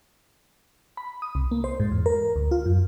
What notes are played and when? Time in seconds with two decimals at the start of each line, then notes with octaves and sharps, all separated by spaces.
0.97 B5
1.22 D#6
1.35 C2
1.51 A#3
1.64 C5
1.80 G#2
1.92 E2
2.06 A#4
2.36 D2
2.51 F4
2.66 F#2